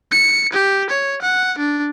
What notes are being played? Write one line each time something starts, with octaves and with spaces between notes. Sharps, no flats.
C#7
G4
C#5
F#5
D4